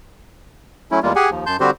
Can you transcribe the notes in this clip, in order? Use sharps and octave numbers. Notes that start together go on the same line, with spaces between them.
F#3 A3 C#4 E4
E2 G3 G#3 A#3 F4
G4 G#4 F#5 G#5
D#2 F3
F#2 A5 C6 G6
D3 G3 C4 F#4 G4 C5